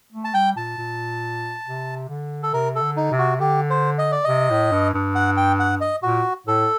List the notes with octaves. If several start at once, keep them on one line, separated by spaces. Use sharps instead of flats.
A3
A5
G3 G5
A#2 A5
A#2
C3
D3
A4
C3 A#4
A4
D3
D#4
C3
F#4
D3 G4
C5
D#5
D5
C3 D#5
A2
G2
G2
F#5
G5
F#5
D#5
A#2 F#4
A2 A4